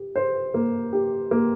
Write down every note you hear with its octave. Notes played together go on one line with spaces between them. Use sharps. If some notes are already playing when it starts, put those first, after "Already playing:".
Already playing: G4
C5
A#3
G4
A#3